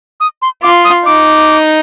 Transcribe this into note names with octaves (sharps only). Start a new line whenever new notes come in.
D#6
C6
F4 D6
D#6
D#4 D6